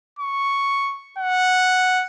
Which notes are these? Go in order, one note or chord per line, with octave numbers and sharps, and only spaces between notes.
C#6
F#5